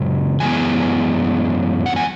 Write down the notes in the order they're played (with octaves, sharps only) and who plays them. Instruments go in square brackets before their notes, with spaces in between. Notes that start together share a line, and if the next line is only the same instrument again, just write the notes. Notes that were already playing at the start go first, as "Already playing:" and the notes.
Already playing: [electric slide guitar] F#2 C#3 G#3
F#2 E3 G#3 B3 G#5
F#5
G#5